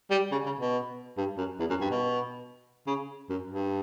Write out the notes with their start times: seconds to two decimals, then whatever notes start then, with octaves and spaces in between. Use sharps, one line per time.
0.11 G3
0.32 C#3
0.46 C#3
0.60 B2
1.17 G2
1.38 F#2
1.60 E2
1.70 F#2
1.81 G2
1.91 B2
2.87 C#3
3.29 F#2
3.50 G2